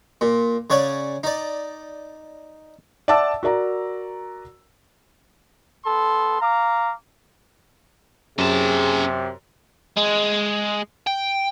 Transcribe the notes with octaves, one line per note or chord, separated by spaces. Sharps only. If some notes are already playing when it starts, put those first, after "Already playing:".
A#2
C#3 C#5 D5 F#5 G#5
D#4 D5
D5 E5 F#5 A5 D6 E6
F#4 A#4 D5 A#5
B3 A4 C6
F5 A#5 D6
F#2 C3 C#4 G#4 A5
G#3
G5